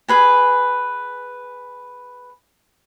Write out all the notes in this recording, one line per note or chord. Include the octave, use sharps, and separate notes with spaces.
G#4 B4 G#5